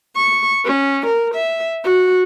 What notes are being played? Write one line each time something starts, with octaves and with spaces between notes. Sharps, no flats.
C#6
C#4
A#4
E5
F#4